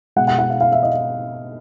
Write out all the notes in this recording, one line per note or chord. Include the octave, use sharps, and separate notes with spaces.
B2 G#3 F#5
F#5
F#5
F5
F5
E5
D#5